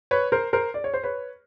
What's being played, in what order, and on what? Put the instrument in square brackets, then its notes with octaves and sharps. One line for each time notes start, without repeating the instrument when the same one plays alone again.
[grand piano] B4 C#5
A#4 C5
A#4 C5
D5
C#5
C5
B4 C#5